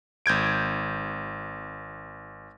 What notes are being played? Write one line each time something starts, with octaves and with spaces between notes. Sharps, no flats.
G#1 G6 G#6 D7